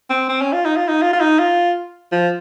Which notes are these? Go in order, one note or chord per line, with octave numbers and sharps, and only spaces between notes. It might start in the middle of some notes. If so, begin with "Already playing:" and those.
C4
C4
C#4
F4
D#4
F4
D#4
F4
F4
D#4
F4
F3